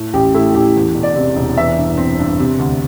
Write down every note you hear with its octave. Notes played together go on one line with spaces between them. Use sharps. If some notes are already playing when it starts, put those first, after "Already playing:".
Already playing: A2
A1 G4
A3 E4
A1 G4
E2
E1
D5
C3
E1
E3 E5
G2
C4
G2
C3
D2